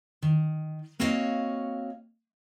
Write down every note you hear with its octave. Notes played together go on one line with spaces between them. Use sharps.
D#3
A#3 C4 F#4 C#5 D#5 F5